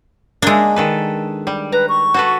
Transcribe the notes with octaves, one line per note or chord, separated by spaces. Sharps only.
G#3 A#3 D4
D#3 A4 B4
G3
B4 A#5
C#6
F#4 A4 B4